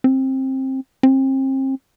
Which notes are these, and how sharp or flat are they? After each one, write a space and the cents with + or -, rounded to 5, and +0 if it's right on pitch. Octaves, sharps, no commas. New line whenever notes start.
C4 +20
C4 +35